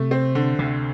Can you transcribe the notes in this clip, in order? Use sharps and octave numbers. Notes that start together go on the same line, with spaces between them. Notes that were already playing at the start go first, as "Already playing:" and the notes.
Already playing: C3 A3
C4
D3
D2 C3